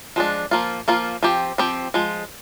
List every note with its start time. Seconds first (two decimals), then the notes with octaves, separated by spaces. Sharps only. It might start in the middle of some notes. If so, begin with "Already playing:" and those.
0.16 F3 G#3 D4
0.51 F3 A#3 F4
0.88 F3 A#3 F4
1.23 F3 C4 G4
1.58 F3 C4 G4
1.94 F3 G#3